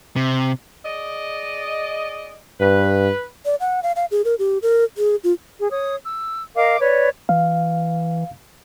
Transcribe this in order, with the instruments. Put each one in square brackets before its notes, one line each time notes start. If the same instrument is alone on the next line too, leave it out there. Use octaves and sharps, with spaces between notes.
[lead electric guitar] C3
[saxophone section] G#4 D5 D#5
[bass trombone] G2 [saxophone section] B4
[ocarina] D5
F#5
F5
F5
G#4
A#4
G4
A#4
G#4
F4
[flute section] G#4
C#5 D#6
E6
A#4 D#5 F5 D6
B4 C#5 D5
[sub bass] E3 [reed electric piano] F5